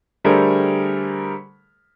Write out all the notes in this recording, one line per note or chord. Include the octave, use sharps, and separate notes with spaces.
D3 G3 A3 G#4 A#4 C5